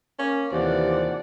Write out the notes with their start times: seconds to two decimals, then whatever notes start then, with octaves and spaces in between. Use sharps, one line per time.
0.19 A#3 C#4
0.52 D#2 C3 E3 F3 D5 F#5